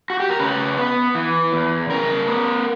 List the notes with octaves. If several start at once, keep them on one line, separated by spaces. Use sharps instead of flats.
F#4
G4
A#4
C#3 B4
B3
E3
E2
C#3 A#4
B3